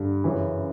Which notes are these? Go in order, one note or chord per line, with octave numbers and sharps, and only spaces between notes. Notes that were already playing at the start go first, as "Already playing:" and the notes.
Already playing: G2 D3
F#2 C#3 E3